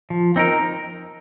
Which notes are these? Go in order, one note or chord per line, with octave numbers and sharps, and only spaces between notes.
F3
C4 D#4 A#4